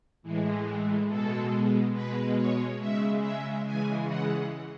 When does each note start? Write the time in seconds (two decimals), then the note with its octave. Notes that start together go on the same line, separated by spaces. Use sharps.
0.23 A2 E3 G#3
1.08 B2 G#3 A4
1.93 B2 G#3 B4
2.36 C#5
2.79 C#3 G#3 E5
3.22 E5
3.64 C#3 E3 G#3 G#5
4.07 F#5